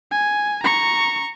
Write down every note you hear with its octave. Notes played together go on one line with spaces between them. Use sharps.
G#5
A#5 C#6